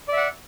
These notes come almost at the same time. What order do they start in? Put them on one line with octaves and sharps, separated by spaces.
D5 E5 F#5